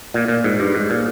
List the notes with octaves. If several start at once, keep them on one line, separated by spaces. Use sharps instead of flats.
A#2
A#2
G#2
G2
G#2
A#2